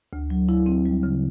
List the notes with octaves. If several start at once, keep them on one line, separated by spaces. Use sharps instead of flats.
D2
F#3
E4
C4
G3
C#3